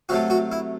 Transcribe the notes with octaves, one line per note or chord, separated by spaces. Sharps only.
C3 F#3 A3 F#4
F#4
E4